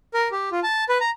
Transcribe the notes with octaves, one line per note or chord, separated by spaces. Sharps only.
A#4
G4
F4
A5
B4
A#5